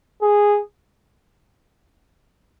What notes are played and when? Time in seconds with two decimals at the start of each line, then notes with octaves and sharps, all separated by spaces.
0.22 G#4